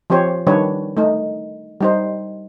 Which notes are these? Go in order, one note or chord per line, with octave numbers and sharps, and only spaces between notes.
F3 C4 G4 C5 C#5
D#3 G3 D4 B4 C#5
A3 D#4
G3 D#4 C5